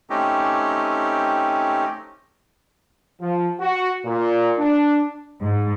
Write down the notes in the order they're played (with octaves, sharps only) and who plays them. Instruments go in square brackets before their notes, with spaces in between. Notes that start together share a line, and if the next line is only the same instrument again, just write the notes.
[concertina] A3 C4 C#4 D#4 G4
[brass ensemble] F3
F#4
A#2
D4
[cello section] G#2